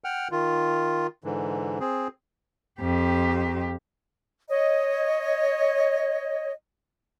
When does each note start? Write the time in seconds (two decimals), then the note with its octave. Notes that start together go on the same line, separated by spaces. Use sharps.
0.04 F#5 G5 F6
0.32 D#3 F4
1.24 G#2 D3 E3
1.80 C4 G#4
2.80 F2 G4
4.49 C#5 D#5